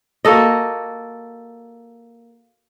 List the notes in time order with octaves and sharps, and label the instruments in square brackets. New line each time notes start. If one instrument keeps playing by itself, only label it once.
[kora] A#3 F#4 A4 D#5